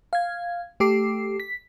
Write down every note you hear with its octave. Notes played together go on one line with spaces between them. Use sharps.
F5 G#6
A3 G4 A4 D6 C7
B6